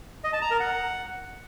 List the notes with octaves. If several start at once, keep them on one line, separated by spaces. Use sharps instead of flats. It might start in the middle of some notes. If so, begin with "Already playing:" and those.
D#5
A5
A#5
A#4
F#5